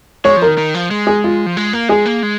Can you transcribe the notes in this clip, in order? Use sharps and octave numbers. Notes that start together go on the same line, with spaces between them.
G#3 C#5
F3
A#4
D#3
D#3
F3
G#3
G#4
F4
F3
G#3
A#3
G#3 G#4
A#3
G#3